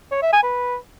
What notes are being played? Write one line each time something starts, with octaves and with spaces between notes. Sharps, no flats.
C#5
E5
G#5
B4